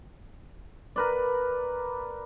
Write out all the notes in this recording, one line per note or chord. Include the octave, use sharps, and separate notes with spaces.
A#4 B4 D5